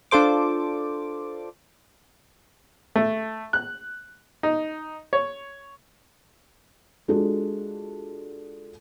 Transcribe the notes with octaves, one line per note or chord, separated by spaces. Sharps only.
D4 F4 A4 C5 D6
A3
F#6
D#4
C#5
G#3 D4 F4 F#4 A4